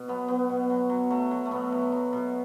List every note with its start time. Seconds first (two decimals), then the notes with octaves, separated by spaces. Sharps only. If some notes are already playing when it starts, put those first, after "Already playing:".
Already playing: B2
0.08 F#3 B3
0.28 F#3 B3
0.49 B2
0.70 F#3
0.90 F#3
1.10 F#3 A3
1.31 F#3
1.46 A3
1.51 B2 B3
1.72 F#3
1.92 F#3
2.13 B2